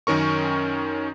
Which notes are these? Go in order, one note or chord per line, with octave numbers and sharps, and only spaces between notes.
F#2 D#3 C#4 A#4 C#6